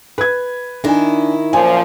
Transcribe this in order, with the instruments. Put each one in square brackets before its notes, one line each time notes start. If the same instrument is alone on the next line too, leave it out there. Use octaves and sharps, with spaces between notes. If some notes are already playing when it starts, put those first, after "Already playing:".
[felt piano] B4 G#6
[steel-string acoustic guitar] D#3 E4 [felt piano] D4 G#5
[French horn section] F#2 A#2 F3 [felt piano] G#5